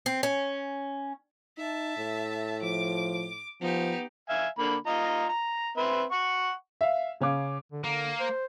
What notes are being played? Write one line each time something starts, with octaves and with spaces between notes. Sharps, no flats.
C4
C#4
D#4 E5 A5
A2
F3 D6
F3 B3 D#4 G4
E5 F5 G#5
D3 A#3 B5
F4 D#5 A#5
A#5
C4 B4 E5
F#5 C#6
E5 F5
C#3 C#4 F5 D6
D3
D3 A#3
C5